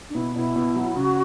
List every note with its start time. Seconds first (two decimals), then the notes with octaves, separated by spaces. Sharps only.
0.10 D4
0.15 B2 E4
0.35 B2 E4
0.56 B2
0.76 F#3
0.96 C#3 F#4